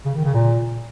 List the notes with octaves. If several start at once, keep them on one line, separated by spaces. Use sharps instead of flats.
C#3
D#3
C#3
A#2